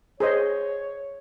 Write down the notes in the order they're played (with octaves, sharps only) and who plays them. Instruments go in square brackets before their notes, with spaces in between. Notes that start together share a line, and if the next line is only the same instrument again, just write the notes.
[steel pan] G#4 C5 D#5 [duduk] C#5